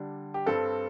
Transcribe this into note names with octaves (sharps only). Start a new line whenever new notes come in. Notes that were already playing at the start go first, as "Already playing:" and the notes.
Already playing: D3 G3 D4
G4
G2 G3 C4 A4